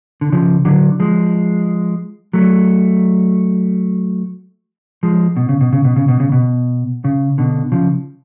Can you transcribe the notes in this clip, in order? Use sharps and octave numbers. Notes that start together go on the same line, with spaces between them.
D3
C#3 F3
D3 F#3
F3 G#3
F#3 A3
F3 G#3
B2
C#3
B2
C#3
B2
C#3
B2
C#3
B2
C#3
B2 D3
C#3 F3